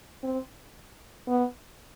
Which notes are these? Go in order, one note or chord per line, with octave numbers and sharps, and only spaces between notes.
C4
B3